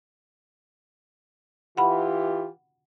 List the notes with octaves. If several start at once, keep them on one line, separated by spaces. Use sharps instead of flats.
E3 F4 G4 F#5 B5